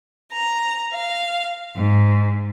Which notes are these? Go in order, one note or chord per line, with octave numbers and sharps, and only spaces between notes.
A#5
F5
G#2